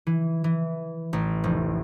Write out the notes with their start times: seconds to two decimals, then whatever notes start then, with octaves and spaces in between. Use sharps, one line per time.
0.07 E3
0.44 E3
1.13 A1
1.44 F1